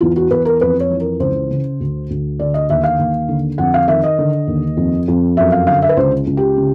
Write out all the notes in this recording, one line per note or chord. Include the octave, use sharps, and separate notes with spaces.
E2 F4
F#4
E2 B4
A#4
F2 B4
C#5
E3
A#4
C#2 C5
C#3
D2
D2
D3 D5
D#5
D#2 E5
F5
D#2
D3
F2 F#5
F5
D#3 E5
D#5
D3
D#2
F2
F2
F#2 E5
F5
D3 F5
E5
B4
C#2 C5
C#2
G4
C#3